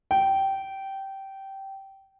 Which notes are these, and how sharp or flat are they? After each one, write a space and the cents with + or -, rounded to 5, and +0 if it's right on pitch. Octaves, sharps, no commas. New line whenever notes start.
G5 -15